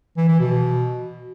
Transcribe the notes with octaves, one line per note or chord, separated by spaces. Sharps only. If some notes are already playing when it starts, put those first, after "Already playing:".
E3
E3
B2